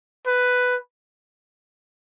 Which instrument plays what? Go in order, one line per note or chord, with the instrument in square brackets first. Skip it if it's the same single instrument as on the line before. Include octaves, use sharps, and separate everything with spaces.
[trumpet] B4